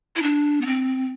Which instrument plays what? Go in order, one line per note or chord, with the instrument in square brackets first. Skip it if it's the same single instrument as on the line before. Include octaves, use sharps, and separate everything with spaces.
[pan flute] E4
D4
B3
C4